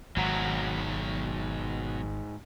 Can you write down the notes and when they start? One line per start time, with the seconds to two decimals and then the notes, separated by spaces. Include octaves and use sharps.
0.17 G#1 G#2 B2 F#3 F#4 A#5